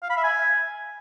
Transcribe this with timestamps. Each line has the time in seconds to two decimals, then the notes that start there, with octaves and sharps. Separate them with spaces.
0.03 F5
0.10 B5
0.17 E5
0.24 G#5